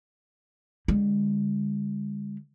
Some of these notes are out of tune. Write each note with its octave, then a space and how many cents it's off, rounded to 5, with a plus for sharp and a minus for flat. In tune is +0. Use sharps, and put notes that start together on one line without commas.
D3 -15 G#3 -40